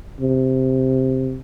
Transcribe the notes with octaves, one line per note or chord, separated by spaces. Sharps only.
C3